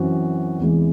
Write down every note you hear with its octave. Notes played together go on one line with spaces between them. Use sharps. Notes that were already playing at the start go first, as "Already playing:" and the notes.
Already playing: F#2 E3 C4 F#4
E2 C3 E3 G#3